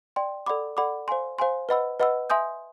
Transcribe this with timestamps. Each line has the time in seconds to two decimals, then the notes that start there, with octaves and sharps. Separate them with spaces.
0.16 D5 G5 C6
0.46 A4 D5 F#5 B5 D6
0.77 A4 D5 F#5 B5 D6
1.08 C5 F5 G#5 C6
1.38 C5 F5 G#5 C6
1.69 B4 D#5 F#5 B5 E6
2.00 B4 D#5 F#5 B5 E6
2.30 E5 G#5 C6 D#6 G6